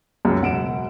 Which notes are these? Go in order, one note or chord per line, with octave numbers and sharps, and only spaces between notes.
C#2 F#2 F#3
E1 F#5 D7 E7